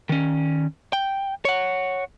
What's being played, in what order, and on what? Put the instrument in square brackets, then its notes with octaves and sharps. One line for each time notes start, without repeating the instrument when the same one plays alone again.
[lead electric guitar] D#3 C#4
G5
C#5 F#5